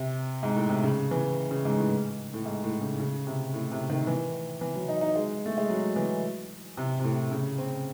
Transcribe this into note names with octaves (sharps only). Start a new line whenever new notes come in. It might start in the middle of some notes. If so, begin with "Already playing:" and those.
Already playing: C3
G#2
A2
C3
C#3
E3
C#3
G#2
A2
A2
G#2
A2
C#3
C#3
C3
A2
C3
D#3
E3
E3
F#3
D#4
D#4
G#3
A3
G#3
F#3
E3
C3
C3
A2
C#3
C4